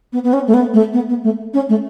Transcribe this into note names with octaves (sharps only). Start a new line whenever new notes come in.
B3
B3
C#4
A3
B3
A3
B3
B3
A3
C#4
A3